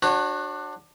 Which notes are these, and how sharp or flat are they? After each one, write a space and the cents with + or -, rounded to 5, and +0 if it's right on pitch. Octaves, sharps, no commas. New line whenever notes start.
D4 +20 F#4 +0 C#5 -30